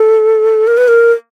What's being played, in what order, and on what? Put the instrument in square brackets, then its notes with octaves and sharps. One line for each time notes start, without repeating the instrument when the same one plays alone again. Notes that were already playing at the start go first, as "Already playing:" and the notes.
Already playing: [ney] A4
A#4
B4
A#4